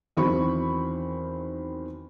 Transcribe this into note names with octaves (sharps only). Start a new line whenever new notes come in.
E2 D#3 F#3 C4 B5 C#6